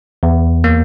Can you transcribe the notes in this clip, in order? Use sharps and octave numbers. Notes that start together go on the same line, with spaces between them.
E2
A#3